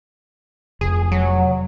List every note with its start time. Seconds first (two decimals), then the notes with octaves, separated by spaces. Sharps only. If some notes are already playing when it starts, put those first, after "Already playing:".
0.81 F1 G#4
1.12 F#3